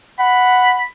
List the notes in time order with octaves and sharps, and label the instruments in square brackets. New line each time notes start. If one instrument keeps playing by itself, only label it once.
[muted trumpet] F#5 [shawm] B5